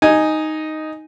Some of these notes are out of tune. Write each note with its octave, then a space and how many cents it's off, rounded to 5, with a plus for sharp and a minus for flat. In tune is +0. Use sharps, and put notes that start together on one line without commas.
D#4 +0 G#5 +0